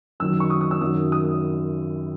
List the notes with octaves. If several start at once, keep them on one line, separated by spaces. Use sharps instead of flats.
F#2 D#3 F#3 E6
C#6
D#6
D#6
E6
F#2 D#3 F#3 D#6
D#6